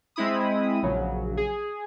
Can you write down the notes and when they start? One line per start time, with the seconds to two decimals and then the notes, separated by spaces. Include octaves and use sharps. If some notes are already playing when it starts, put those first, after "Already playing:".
0.16 G#3 C4 E4 B5 D#6
0.83 A#1 C#3 F#3
1.37 G#4